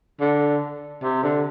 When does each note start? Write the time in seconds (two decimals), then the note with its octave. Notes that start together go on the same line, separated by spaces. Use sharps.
0.20 D3
1.03 C3
1.23 D3